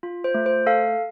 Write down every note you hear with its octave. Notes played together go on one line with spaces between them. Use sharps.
F4
C5
A3
C5
A4 F5